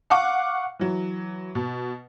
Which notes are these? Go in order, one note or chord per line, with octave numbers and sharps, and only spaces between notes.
F5 F#5 C#6 D6
E3 F#3
B2